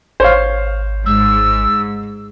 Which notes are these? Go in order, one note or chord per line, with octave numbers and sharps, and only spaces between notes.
G#1 C5 C#5 F5
G#2 E6